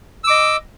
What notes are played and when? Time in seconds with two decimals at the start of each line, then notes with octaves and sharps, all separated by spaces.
0.24 E6
0.27 D6
0.30 D#5